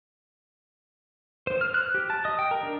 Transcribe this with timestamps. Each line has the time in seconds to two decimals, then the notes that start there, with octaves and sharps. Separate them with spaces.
1.47 C5
1.61 F6
1.74 F#6
1.95 G4
2.10 A5
2.25 D#5
2.39 G5
2.51 A#4
2.63 D4